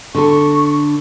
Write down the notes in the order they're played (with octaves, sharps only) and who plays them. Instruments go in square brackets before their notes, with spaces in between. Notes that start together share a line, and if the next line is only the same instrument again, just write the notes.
[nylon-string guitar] D3 A4 [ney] C#6